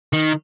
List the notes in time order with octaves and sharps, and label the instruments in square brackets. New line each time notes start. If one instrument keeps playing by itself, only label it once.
[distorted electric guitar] D#3